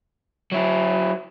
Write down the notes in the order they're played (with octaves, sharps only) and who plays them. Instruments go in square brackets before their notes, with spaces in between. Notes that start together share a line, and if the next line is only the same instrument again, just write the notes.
[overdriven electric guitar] F#3 E4